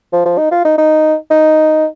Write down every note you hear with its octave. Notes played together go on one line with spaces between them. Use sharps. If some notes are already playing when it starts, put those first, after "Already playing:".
F3
F3
D#4
F4
D#4
D#4
D#4